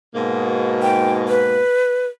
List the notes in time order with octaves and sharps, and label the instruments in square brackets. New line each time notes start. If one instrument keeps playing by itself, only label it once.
[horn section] G#2 B2 A#3
[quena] G5
B4